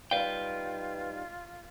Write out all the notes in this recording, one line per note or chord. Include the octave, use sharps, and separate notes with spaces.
G3 D#4 F4 B4 F5 G5